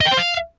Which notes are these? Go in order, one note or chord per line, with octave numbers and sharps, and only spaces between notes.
D#5
G5
C5
F5